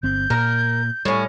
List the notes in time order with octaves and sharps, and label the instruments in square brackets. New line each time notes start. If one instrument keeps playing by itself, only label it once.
[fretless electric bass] G1 C4 [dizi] G6
[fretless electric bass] A#2 [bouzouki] A#4
[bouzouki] A2 C#4 [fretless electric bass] G3